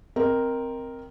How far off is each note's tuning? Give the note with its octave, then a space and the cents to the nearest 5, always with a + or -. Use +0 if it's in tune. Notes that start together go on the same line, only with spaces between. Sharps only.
C4 +0 A#4 +0 D#5 +0